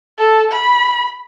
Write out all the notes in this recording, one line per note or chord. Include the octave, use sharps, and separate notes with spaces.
A4
B5